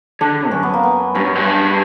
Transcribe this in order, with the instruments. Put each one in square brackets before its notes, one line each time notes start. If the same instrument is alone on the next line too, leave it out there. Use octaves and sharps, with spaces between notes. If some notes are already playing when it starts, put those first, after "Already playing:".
[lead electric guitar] D3 [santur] D4
[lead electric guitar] F#2 [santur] C#4
[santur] B3
A#3
B3
[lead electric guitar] G2 [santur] C#4
[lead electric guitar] F#2
G2